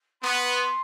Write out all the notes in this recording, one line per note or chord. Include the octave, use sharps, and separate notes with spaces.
B3 C6